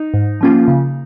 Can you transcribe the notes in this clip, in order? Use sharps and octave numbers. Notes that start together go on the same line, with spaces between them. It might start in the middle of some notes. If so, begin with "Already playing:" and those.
Already playing: D#4
G#2
F3 A#3 C#4 F4
C#3